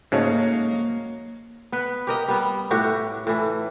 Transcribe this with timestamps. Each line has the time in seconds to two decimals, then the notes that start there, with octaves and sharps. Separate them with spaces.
0.12 G#2 C#3 A3 A#3 F#4 C#5 D#5
1.72 B3 B4
2.07 G4 A#4 D#5
2.28 G3 B3
2.71 A2 F#4 G4
3.27 A2 E3